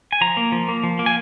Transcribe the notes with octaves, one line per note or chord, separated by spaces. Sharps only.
G#5
F3 A#5
A#3
F3
A#3
F3
A#3
G#5